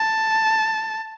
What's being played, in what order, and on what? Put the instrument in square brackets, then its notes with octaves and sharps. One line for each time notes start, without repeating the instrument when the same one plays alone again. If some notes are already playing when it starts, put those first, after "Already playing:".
Already playing: [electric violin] A5